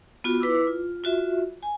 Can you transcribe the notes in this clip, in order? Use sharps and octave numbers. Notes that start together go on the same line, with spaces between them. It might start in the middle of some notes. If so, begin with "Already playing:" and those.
B3 F4 F#4
E4 B4 D6 E6
F4
F4 F#4 E5
G#5